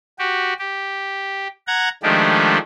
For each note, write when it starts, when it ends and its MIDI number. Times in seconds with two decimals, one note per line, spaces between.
0.19 0.53 66
0.19 0.53 67
0.59 1.48 67
1.67 1.89 78
1.67 1.89 82
1.67 1.89 92
2.03 2.58 51
2.03 2.58 53
2.03 2.58 56
2.03 2.58 57
2.03 2.58 62
2.03 2.58 67